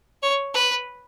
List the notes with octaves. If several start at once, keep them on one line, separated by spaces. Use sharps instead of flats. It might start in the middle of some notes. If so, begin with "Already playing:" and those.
C#5
B4